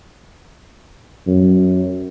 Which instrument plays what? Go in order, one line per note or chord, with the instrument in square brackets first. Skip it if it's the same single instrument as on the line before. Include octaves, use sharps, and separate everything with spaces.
[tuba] F#2